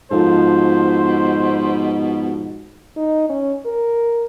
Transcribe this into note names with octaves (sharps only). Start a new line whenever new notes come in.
G#2 B2 F3 F4 A4 C5
D#4
C#4
A#4